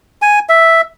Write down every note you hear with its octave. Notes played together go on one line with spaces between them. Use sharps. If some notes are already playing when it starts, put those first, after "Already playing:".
G#5
E5